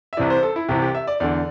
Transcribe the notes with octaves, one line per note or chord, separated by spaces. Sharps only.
E5
C2 C3 E3 D5
C5
A4
E4
C2 C3 E3 G4
G4
E5
D5
E2 D3 D5